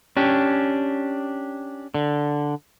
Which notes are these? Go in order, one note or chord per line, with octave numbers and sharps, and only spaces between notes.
C#4 D4 G4
D3